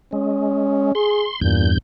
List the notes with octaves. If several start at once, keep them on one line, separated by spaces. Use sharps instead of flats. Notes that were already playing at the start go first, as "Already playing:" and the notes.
G#3 C#4
G#4 C6
E2 G2 A#2 G6